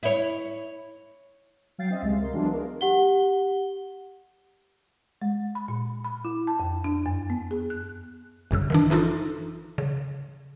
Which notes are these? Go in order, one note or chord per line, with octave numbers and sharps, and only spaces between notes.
E4 C#5
F#3 F5 G5 A6 C7
C4 C#4 D#5 E5
C#2 C3 G#3 F5
A#4 C6
E3 F#3 G#3 B3 D4 F4
G#4 A#4
G4 F#5 G7
G#3
B5
A#2
B5
E4
A5
F2
D4
F#2
B3
G#4
F#6
G1 F#2 C#3 E6
D#3 E3 D4
E3 D4 D#4 F4 A4
C#3